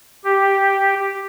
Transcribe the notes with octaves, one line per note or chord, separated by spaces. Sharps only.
G4